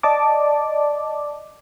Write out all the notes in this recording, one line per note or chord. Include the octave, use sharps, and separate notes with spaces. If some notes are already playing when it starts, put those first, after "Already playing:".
D5 D#5 A5 D6